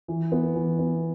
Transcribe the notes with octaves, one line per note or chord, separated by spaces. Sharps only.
E3
B3
E3
B3